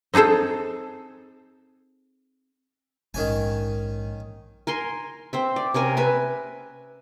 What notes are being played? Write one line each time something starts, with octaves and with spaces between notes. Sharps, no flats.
C4 D#4 G#4 A4 C5
A#1 G#2 D#3 C#4 G#5
A#4 G#5 C6
C4 C5 E5
D5
C3 C#4 A#4 G#5
B4 E5 G#5